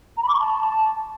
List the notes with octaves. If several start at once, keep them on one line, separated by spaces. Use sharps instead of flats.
A#5
B5
D6
C#6
A5